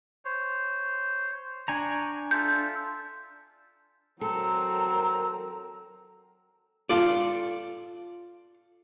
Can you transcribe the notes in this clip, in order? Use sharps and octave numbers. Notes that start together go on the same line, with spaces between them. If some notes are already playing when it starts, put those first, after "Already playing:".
C5 C#5
D4 G5 G#5 A#5 C#6
F4 A4 E5 G6
F#3 C4 A4 A#4 A#5
F4 A4 D5